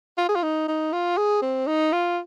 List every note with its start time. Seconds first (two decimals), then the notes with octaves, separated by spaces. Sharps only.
0.18 F4
0.29 G#4
0.35 F4
0.43 D#4
0.68 D#4
0.92 F4
1.17 G#4
1.42 C4
1.67 D#4
1.92 F4